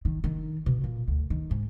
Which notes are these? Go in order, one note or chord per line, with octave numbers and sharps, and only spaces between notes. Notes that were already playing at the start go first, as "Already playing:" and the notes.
D#3
D#3
B2
A#2
D2
D#3
G#2